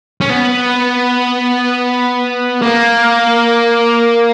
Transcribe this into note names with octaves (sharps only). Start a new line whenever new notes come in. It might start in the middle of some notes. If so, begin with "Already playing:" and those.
C#4
B3
A#3